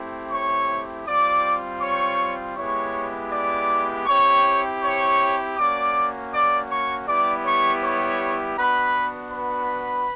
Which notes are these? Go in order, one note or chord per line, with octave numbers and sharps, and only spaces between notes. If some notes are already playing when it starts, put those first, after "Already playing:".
Already playing: A3 C4 E4 G4
C#5 C#6
G3 C4 F4 D5 D6
C#5 C#6
G#3 B3 E4 G4 C#5 C#6
D5 D6
C4 E4 G4 C#5 C#6
C#5 C#6
A#3 C#4 F#4 D5 D6
D5 D6
C#5 C#6
G3 B3 E4 G4 D5 D6
C#5 C#6
C#5 C#6
B3 D4 F#4 B4 B5
B4 B5